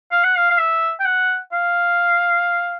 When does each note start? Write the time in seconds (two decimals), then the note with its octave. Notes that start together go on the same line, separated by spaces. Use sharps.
0.12 F5
0.24 F#5
0.37 F5
0.51 F5
0.58 E5
1.00 G5
1.05 F#5
1.53 F5